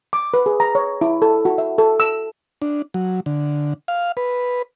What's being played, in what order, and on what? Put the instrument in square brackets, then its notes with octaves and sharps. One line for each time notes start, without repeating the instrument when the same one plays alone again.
[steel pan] D6
B4
G#4
A#5
C#5
E4
A4
F#4
E5
A4
E6
[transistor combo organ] D4
F#3
D3
F5
B4